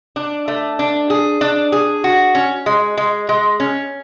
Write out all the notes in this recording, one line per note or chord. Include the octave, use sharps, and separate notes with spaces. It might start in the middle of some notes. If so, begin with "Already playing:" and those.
D4
A3
D4
G#4
D4
G#4
F#4
C#4
G#3
G#3
G#3
C#4